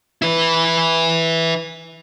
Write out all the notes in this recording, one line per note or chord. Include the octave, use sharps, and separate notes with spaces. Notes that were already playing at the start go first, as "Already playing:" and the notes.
E4 B4